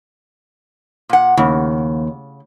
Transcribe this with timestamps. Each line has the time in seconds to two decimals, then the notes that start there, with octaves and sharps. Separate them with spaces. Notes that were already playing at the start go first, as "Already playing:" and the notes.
1.09 A#2 F#5
1.37 D#2 C#3